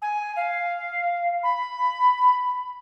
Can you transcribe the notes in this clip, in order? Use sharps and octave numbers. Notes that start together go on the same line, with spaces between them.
G#5
F5
B5